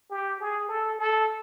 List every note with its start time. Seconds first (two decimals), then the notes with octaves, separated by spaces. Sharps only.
0.10 G4
0.40 G#4
0.69 A4
0.98 A4